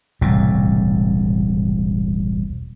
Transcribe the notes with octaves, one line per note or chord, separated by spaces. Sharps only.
E1 C2 A2